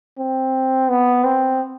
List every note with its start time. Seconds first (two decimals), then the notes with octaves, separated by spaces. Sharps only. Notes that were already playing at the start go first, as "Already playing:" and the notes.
0.18 C4
0.89 B3
1.24 C4